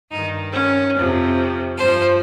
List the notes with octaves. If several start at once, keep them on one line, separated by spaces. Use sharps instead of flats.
G2 D#3 D#4
C#4
F2 C3 F3
G2 F3 C5